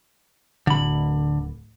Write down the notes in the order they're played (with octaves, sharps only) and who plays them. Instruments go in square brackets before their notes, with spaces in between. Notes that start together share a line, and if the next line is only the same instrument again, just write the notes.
[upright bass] D1 [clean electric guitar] D3 B5